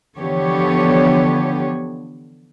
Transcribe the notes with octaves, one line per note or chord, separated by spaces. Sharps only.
D3 E3 F3 B3 G4 C#5